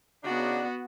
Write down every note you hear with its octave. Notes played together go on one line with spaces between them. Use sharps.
C#3 B3 D4 D#4 F#4